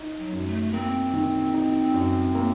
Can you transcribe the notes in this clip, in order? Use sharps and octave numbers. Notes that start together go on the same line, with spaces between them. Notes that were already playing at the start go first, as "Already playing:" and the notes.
Already playing: D#4
F#3
F#2
A3
A#3 C4
D#3
D#4
F#2
A#3